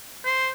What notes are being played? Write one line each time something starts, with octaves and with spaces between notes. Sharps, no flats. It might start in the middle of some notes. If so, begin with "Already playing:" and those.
C5